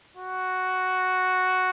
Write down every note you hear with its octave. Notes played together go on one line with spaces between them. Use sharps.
F#4